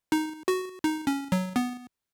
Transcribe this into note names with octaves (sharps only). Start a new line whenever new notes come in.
D#4
F#4
D#4
C#4
F#3
B3